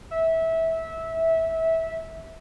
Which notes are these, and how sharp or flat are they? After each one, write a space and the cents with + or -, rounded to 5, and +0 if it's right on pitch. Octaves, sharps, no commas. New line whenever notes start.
E5 -20